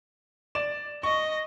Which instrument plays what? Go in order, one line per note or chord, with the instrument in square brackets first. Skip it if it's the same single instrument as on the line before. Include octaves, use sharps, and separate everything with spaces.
[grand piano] D5 E7
[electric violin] D#5 [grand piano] C#6